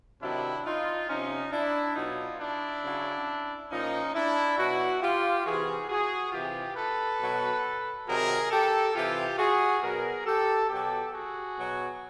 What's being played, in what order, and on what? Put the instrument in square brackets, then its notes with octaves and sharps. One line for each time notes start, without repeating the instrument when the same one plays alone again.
[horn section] C3 D#3 F#3 D4 E4
D#4 F4
C3 F3 C#4 D#4
D4 E4
B2 F#3 D#4 F4
D4 E4
C#3 F#3
A#2 F3 C#4 D#4
D4 E4
B2 F#3 E4 F#4
F4 G4
C3 E3 F#4 G#4
F#4 G#4
C3 E3 F4 G4
A4 B4
B2 F#3
C3 D#3 F#3 G#4 A#4
G4 A4
C3 E3 F4 G4
F#4 G#4
B2 F#3 G#4 A#4
G4 A4
B2 F#3 G4 A4
F#4 G#4
B2 F#3